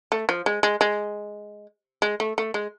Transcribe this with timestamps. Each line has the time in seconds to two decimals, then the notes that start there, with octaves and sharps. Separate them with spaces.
0.12 A3
0.29 F3
0.46 G#3
0.63 G#3
0.81 G#3
2.02 G#3
2.20 A3
2.38 A3
2.54 G#3